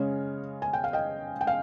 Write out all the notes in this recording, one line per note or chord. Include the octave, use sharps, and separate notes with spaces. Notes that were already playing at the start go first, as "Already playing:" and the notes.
Already playing: C#3 G#3 C#4 C#5
G#5
G5
F5
D#5 G5
G5
F5